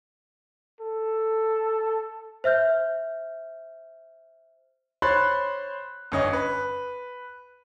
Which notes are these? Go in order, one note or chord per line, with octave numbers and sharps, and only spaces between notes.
A4
C5 E5 F6 G6
C5 C#5 B5 C6 F#6 A6
G1 C#4 D#5
B4